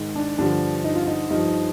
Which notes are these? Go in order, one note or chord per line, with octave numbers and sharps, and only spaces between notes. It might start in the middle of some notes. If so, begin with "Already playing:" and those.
Already playing: G#2 D#3
D4
G2 D3 F3 D4
D#4
F4
D#4
G2 F3 D#4